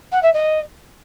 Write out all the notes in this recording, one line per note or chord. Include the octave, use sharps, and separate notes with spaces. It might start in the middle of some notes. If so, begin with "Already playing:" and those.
F#5
E5
D#5